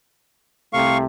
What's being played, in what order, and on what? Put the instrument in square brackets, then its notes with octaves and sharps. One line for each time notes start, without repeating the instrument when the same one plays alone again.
[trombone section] C2 C3 A3 [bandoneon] F5 C#6